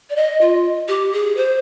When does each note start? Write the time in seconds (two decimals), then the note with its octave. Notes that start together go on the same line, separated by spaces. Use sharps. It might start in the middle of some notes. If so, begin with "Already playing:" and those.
0.10 D5
0.16 D#5
0.41 F4
0.88 G4
1.13 G#4
1.37 C5